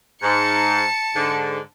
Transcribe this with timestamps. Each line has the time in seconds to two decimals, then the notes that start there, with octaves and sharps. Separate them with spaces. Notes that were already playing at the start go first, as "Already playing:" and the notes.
0.23 G#2 A5 C#7
1.15 G#2 D3